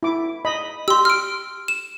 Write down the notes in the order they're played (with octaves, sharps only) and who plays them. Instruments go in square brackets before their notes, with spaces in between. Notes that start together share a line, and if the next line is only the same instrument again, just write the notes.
[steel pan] E4 D6
D#5 B5
[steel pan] G4 [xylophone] C6 E6
[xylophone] F6 D7
E7